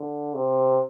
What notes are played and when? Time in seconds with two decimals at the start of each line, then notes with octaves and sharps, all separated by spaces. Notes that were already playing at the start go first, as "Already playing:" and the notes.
Already playing: D3
0.34 C3